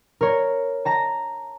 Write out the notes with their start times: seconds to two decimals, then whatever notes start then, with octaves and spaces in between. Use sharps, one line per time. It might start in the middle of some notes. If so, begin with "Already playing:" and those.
0.21 A#4 C#5
0.85 A5 A#5 A#6